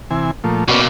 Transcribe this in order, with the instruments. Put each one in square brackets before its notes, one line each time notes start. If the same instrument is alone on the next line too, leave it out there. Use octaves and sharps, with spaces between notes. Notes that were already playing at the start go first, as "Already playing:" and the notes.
[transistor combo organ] C3 E3 G#5
A#2 F3 A3
[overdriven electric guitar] B2 A#3 [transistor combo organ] C#4 B4 D5